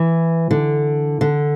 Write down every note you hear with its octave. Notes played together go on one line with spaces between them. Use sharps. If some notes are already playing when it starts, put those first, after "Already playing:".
Already playing: E3
D3
D3